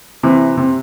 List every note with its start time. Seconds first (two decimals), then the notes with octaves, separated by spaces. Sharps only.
0.23 C3 E3
0.57 C3